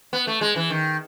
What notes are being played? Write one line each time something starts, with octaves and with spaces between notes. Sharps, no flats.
B3
A3
G#3
E3
D#3